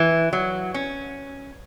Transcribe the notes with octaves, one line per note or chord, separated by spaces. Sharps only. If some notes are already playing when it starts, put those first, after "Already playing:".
Already playing: E3
F#3
C#4